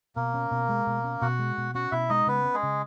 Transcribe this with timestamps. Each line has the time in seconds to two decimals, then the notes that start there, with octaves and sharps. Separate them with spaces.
0.16 B2 A#3 A#4
0.34 C#4
0.51 B2
0.69 G#3
0.87 B2
1.04 C#4
1.21 B2 F#4 F#5
1.39 G#3
1.58 B2
1.75 C#4 F#4 F#5
1.92 B2 E4 E5
2.09 G#3 D#4 D#5
2.27 C#3 B3 B4
2.45 C#4
2.54 G#3 G#4
2.63 C#3